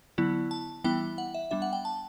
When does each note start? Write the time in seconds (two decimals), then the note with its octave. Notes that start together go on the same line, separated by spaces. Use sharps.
0.18 D3 F#3 B3 E4
0.51 A5
0.84 E3 G3 B3 E4 G5
1.18 F#5
1.34 E5
1.51 G3 B3 D4 E5
1.62 F#5
1.73 G5
1.85 A5